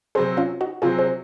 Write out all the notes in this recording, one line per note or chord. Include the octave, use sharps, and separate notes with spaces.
C3 F#3 C4 G#4 C5
C#4 F4
D#4 F#4
C3 F#3 C4 F4 G#4
G#4 C5